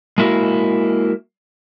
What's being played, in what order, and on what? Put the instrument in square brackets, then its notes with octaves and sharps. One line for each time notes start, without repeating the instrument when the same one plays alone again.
[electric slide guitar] G#3 A#3 E4 F#4